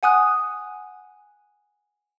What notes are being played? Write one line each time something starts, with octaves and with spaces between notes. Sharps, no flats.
F#5 G#5 D#6 F#6